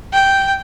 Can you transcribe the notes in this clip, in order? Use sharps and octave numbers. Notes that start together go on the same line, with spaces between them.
G5